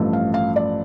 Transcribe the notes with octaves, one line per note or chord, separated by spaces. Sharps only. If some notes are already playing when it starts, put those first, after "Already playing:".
Already playing: A1 G2 F3 A3
F5
F5
D5